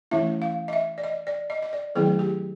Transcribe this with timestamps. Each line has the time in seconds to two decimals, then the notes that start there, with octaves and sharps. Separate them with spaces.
0.11 E3 A3 C#4 E4 E5
0.42 F5
0.68 D#5
0.73 E5
0.98 D5
1.04 D#5
1.27 D5
1.50 D#5
1.63 D#5
1.73 D5
1.95 D#3 F#3 A3 C4 E4 G#4
2.19 G4